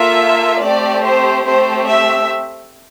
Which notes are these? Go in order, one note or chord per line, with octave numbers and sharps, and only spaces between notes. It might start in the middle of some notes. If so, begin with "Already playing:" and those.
Already playing: A#3 F4 A4 E5
A3 C4 G4 D5
C5
A3 C4 G4 C5
E5